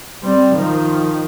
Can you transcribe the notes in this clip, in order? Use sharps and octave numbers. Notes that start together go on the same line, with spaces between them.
G3 C4
D#3 F3